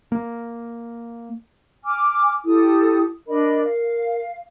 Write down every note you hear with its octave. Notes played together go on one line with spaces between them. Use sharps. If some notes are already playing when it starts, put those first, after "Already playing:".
A#3
G#5 D6 F6
E4 G4 A4 D#6
D4 A#4 D#5 B5
F5